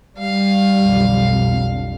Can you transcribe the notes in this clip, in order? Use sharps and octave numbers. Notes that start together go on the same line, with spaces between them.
G3 F5
B1 F2 D3